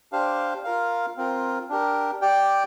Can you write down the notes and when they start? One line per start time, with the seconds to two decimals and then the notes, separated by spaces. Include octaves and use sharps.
0.12 D4 G4 C5 F5
0.64 F4 A#4 F5
1.17 C4 F4 A#4
1.69 D4 G4 A#4
2.22 G4 D5 G5